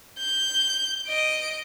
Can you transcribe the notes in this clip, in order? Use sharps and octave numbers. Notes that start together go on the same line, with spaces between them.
G6
D#5 D7